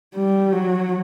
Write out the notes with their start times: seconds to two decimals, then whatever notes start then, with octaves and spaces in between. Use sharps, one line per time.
0.15 G3
0.53 F#3